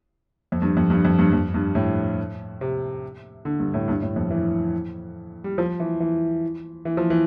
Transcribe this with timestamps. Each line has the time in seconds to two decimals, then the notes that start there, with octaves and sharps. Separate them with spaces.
0.52 F2
0.62 G2
0.77 F2
0.90 G2
1.05 F2
1.19 G2
1.33 F2
1.54 G2
1.75 A2
2.61 C3
3.45 D3
3.60 G2
3.74 A2
3.88 G2
4.02 A2
4.16 F2
4.30 E3
5.44 G3
5.58 F3
5.80 E3
6.00 E3
6.85 E3
6.97 F3
7.10 E3